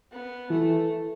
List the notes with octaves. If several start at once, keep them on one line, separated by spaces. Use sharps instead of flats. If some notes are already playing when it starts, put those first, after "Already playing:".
B3
E3 A3